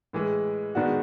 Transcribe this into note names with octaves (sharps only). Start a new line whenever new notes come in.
A2 E3 G#3
D#3 G#3 B3 D4 F#4